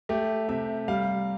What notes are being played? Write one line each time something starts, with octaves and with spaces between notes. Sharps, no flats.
A3 G4
C3 E5
G3 F5